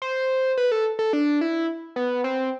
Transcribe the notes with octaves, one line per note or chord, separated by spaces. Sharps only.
C5
B4
A4
A4
D4
E4
B3
C4